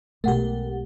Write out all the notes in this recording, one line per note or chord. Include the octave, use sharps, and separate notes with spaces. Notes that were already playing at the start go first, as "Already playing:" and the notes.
B1 G#3 A3 G4 A#4 F#5